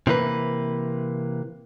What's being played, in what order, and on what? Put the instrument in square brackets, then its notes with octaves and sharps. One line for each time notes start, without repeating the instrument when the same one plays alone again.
[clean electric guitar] C3 E3 A#3 B4